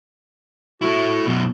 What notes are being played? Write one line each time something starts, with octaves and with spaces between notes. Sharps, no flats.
A3 E4 F#4
F#2 B2